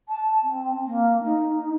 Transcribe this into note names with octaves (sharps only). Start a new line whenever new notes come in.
A5
C4
A#3
D#4